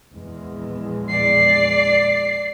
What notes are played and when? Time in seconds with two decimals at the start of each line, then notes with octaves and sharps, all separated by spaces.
0.15 A#1 E2 G#3
1.09 D5 C7